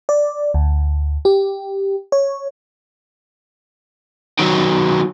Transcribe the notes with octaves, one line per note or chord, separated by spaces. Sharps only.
D5
D2
G4
C#5
D#3 F#3